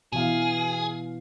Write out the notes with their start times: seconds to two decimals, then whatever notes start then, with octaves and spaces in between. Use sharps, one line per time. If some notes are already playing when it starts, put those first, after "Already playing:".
0.13 B2 E3 G#4 F5